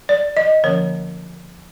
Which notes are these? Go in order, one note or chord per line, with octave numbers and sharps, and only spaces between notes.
D5
D#5
D3 F3 A#3 C#4 C#5